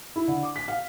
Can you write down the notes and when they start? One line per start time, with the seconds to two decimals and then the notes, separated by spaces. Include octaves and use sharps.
0.16 E4
0.28 D3
0.43 D6
0.56 B6
0.68 F5